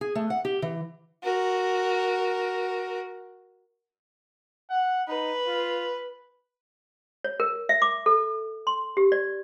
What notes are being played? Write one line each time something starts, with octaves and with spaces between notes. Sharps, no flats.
G#4
A3
F#5
G4
E3
F#4 A#4
F#5
D#4 B4
F4
C#5
A#4
E5
D6
A4
C6
G4
D5